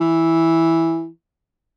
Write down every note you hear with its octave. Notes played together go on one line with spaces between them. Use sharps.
E3